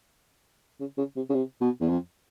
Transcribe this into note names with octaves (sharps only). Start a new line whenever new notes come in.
C#3
C#3
C3
C#3
C3
B2
E2
F2